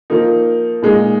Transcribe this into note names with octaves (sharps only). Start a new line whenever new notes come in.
F3 A#3 D#4
A#2 G#3 D#4